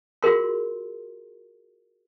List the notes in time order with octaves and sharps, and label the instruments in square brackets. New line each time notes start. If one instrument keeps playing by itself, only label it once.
[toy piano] F4 F#4 G#4 A#4 C6